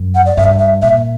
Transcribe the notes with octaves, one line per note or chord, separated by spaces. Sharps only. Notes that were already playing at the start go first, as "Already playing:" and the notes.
Already playing: F#2
F#5
D5
G2 E5
E5
A#2 E5